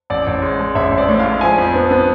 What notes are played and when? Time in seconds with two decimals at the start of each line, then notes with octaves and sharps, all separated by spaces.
0.10 A1 D5
0.27 A1
0.42 G#3
0.59 G#3
0.75 A1 E5
0.92 A1
0.98 D5
1.09 A2
1.19 F5
1.25 G#3
1.41 F3 G#5
1.58 F2
1.75 B3
1.91 B3